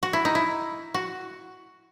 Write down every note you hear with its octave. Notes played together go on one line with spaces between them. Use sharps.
F#4
E4
D#4
E4
F#4